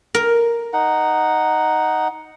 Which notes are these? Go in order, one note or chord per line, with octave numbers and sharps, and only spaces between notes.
A#4
D#4 F#5